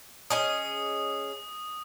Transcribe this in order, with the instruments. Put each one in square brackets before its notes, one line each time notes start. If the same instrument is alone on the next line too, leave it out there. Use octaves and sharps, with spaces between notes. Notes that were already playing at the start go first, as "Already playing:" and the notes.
[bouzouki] C#4 G#4 D#5 [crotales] D#6